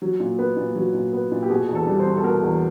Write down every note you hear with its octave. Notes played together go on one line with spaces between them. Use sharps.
F#3
A#2
B3
A#2
F#3
A#2
B3
A#2
G4
B2 G#4
E2
A4
G3
C5
C4
A4
B2 A#4
E2